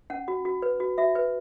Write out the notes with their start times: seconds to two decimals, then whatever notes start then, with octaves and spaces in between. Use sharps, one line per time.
0.10 C#4 F#5
0.28 F#4
0.45 F#4
0.62 B4
0.80 F#4
0.98 F#4 E5
1.15 B4